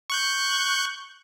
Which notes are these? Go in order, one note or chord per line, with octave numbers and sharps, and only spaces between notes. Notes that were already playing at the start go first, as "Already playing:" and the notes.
C#6 F#6 G6